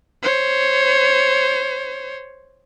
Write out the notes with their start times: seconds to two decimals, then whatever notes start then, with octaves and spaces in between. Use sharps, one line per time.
0.22 C5 C#5